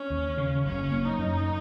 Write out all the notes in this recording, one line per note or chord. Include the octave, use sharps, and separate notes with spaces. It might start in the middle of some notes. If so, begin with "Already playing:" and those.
Already playing: C#4
D#2
C#3
F#1 C#4
A#3
D#4
F#2